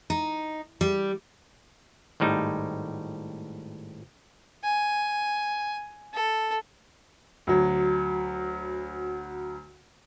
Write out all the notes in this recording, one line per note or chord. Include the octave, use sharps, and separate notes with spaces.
D#4
G3
G#1 A2 G3 D#4
G#5
A4
D2 F#3